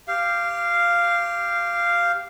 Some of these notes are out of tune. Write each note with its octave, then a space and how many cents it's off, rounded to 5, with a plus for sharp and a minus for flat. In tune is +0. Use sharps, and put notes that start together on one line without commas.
G4 +0 F5 -10